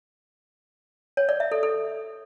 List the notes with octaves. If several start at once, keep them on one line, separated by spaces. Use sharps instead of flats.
C#5
D5
E5
A4
A4